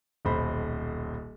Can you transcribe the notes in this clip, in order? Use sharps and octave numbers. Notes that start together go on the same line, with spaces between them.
D#1 B1 C5 B5